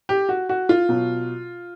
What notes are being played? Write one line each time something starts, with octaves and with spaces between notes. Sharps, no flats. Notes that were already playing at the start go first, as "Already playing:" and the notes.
G4
F#4
F#4
F4
B2 F#3